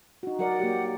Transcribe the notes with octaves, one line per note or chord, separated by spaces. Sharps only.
D#4 F#4
F#3 A#4 D5 F#5
A#3 G4